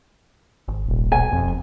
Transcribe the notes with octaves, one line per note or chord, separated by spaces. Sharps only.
G#1
D#1
B1 G#5
F1 F2